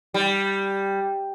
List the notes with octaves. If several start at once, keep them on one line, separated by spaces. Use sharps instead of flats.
G3